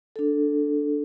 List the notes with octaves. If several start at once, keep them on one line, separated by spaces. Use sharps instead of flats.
D4 A4